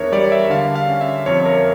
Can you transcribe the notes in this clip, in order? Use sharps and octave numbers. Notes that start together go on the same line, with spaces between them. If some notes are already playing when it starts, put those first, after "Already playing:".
Already playing: E2 D4 A#4 C#5 E5
G3 D5
E5
D3 F5
F5
C#4
E5
F2 C#5
A#4